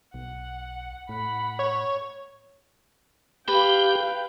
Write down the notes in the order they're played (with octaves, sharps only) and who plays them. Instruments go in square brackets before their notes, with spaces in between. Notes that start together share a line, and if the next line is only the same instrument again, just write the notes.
[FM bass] B1 [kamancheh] F#5
[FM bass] A2 [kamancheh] F#5 B5
[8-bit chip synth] C#5
[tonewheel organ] G4 [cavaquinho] B4 [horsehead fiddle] F5 G5